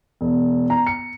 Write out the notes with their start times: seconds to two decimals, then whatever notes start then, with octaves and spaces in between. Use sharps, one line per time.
0.21 E1
0.70 A#5
0.87 C#7